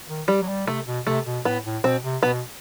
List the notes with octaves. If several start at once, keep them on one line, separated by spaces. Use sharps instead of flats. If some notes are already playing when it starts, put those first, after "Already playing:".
D#3
G3
F#3
G3
C3 A3
B2
C3 A3
B2
A2 B3
A2
B2 C4
C3
B2 B3